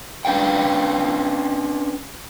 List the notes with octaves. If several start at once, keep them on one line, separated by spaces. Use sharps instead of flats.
C#4 D4 B4 F5 G5